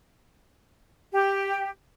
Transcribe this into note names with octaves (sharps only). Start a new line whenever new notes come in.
G4